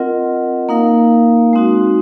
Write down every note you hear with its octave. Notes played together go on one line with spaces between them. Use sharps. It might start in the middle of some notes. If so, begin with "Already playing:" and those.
Already playing: C4 F4 A#4 D#5 F#5
A#3 D#4 A#4 F5
G#3 C4 D#4 F#4